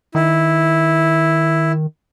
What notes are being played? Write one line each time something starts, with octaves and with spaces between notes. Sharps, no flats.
D#3 E4